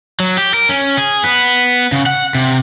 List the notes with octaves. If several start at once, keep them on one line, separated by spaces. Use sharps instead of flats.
F#3
G4
A#4
C#4
G#4
B3
C#3
F#5
C3